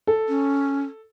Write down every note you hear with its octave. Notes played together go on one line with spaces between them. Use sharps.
A4
C#4